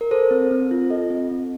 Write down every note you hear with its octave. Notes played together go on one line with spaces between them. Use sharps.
A#4
A4 C5
C4
C4
F4
A4 D#5
C4
C4